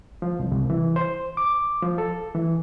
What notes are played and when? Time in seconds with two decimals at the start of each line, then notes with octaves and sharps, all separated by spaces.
0.22 F3
0.39 C2
0.52 C2
0.70 E3
0.96 C5
1.37 D6
1.83 F3
1.98 A4
2.35 E3